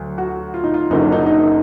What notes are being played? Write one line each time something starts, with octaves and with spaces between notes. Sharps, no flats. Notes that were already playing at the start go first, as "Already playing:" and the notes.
Already playing: D2 F#3
F#4
F4
D#4
F4
F#1 F#2 D3 F#3 D#4
D4
D#4
D#4